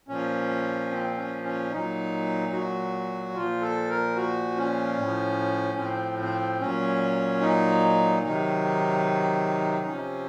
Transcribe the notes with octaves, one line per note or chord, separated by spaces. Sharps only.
A#2 F3 C#4
C4
C#4
C#4
A#2 F#3 D#4
F#4
A#2 F3 F4
A4
A#4
F#4
C#4
A2 F3
C4
C4
A#2 F#3 C#4
D#4
C3 D#3 F#3 D#4
C3 F3 C#4